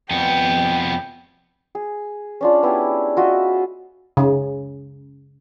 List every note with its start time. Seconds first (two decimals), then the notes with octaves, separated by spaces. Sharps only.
0.11 F2 B3 G5
1.75 G#4
2.41 C#4 D4 F4
2.63 B3 E4 G4 G#4
3.17 F4 F#4 D#5 E5
4.17 C#3